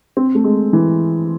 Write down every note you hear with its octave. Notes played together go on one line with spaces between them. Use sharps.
C4
A3
G#3
E3